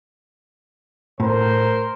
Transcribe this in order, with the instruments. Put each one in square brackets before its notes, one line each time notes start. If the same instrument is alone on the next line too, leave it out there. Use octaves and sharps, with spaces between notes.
[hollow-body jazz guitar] A2 [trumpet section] A#4 C5